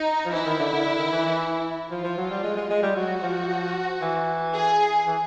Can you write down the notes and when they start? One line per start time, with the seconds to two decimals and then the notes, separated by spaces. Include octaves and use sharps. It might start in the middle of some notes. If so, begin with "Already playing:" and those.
Already playing: D#4
0.25 F3
0.33 E3 E4
0.46 D#3
0.59 D3
0.72 D3
0.85 D3
0.99 D#3
1.12 E3
1.25 E3
1.91 F3 F4
2.04 F3
2.17 F#3
2.30 G3
2.43 G#3
2.57 G#3
2.70 G#3
2.83 G3
2.96 F#3 F#4
3.22 F3
4.01 E3
4.54 G#4
5.07 E3